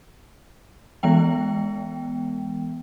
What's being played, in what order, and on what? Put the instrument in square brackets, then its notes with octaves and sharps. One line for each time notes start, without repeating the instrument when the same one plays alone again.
[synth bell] E3 G#3 B3 G5